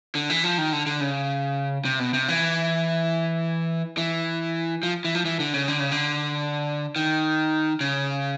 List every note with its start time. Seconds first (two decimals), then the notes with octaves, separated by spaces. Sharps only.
0.15 D3
0.30 E3
0.44 F3
0.58 D#3
0.72 D3
0.86 D3
1.01 C#3
1.85 C3
1.99 B2
2.14 C3
2.28 E3
3.98 E3
4.83 F3
5.05 E3
5.15 F3
5.25 E3
5.40 D3
5.54 C#3
5.68 D3
5.80 C#3
5.91 D3
6.96 D#3
7.81 C#3